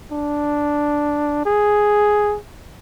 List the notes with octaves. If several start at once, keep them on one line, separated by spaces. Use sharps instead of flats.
D4
G#4